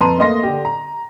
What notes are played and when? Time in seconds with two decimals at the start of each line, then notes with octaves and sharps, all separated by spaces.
0.01 F2 B4 A5 A#5 C6 D#7
0.18 A3 A#3 D#5 C6 A#6
0.43 D3 G4
0.65 A#5